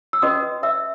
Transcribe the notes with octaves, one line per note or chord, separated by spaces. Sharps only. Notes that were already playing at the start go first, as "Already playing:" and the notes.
E6
C#4 F#4 B4 D#5 D#6
E5 E6